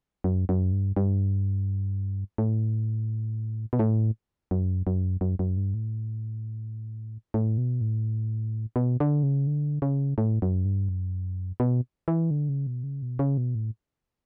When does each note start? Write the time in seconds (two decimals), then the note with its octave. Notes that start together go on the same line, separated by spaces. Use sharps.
0.24 F#2
0.49 F#2
0.72 G2
0.96 G2
2.38 A2
3.73 B2
3.79 A2
4.51 F#2
4.87 F#2
5.21 F#2
5.39 F#2
5.57 G2
5.74 A2
7.34 A2
7.58 B2
7.81 A2
8.76 B2
9.00 D3
9.23 C#3
9.47 D3
9.82 C#3
10.18 A2
10.42 F#2
10.65 G2
10.89 F#2
11.60 B2
12.08 E3
12.31 D3
12.49 C#3
12.67 B2
12.83 C#3
13.02 B2
13.19 C#3
13.37 B2
13.55 A2